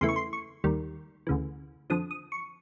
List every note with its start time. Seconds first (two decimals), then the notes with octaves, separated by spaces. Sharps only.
0.01 E2 C#3 E3 A3 C6
0.09 C#6
0.16 C6
0.33 C#6
0.64 D#2 D#3 G3
1.27 D2 C#3 E3
1.90 F2 D3 F3 D#6
2.11 D#6
2.32 C#6